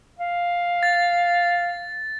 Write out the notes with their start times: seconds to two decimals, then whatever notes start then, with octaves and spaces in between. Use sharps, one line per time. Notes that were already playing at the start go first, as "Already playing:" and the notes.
0.19 F5
0.83 A6